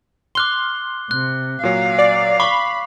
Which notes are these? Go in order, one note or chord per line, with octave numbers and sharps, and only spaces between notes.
C6 D6 F6 F#6 G7
C3 F#6
A#2 F#3 F5
D5
B5 C#6 D6